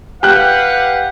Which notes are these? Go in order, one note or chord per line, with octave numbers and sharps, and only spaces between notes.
G4 B4 F5 F#5 F#6